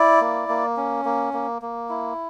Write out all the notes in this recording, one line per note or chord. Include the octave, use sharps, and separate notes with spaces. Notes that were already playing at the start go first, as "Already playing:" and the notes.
Already playing: E4 D5
A#3
A#3
C#4
A#3
A#3
A#3
E4